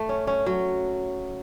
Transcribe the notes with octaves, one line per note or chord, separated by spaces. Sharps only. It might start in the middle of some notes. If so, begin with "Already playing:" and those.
Already playing: A3
C#4
C#4
F#3